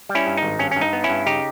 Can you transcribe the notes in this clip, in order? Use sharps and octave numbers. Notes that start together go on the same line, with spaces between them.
G3
C#4 E4
G2
D#4
G#1
G2 C#4
C#4
G2
D#4
B3
C#4 E4
G2
C#3 D#4 G4